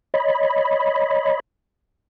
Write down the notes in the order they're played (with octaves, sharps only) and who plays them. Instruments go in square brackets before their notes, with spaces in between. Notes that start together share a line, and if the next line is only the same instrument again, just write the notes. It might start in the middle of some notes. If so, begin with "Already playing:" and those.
[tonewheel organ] C#5 D#5 B5